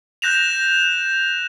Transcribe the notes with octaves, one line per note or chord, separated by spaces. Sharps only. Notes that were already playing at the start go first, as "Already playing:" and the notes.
F#6 G6 A#6 E7 F7